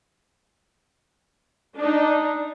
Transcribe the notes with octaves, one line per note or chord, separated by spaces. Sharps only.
D4 D#4